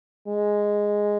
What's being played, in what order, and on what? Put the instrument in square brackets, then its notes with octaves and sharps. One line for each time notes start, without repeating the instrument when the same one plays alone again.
[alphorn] G#3